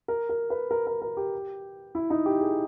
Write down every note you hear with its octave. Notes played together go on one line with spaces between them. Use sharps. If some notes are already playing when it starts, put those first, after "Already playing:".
A#4
A#4
B4
A#4
A#4
A#4
G4
E4
D#4
G4
G#4